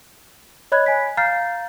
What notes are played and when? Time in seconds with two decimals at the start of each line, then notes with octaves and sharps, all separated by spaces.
0.72 C#5 D#5 B5 F#6 G#6
0.86 G#5 B6
1.17 F5 A#5 F6 G6 A6 C7